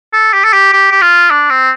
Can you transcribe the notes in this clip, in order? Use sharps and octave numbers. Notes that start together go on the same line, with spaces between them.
A4
G4
A4
G4
G4
G4
F4
D4
C4